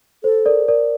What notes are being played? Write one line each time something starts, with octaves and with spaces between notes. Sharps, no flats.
A4 C5
A#4 D5
A#4 D5